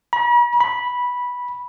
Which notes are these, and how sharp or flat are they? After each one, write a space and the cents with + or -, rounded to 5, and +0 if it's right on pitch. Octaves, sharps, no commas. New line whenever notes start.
B5 -45
B5 -10